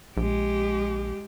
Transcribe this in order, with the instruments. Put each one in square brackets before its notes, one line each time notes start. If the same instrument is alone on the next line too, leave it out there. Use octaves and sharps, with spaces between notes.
[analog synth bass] A#1 [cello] G#3 G4